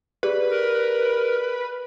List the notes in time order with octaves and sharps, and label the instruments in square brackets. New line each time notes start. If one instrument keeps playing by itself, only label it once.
[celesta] G4 G#4 D5 [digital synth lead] B4
[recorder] A#4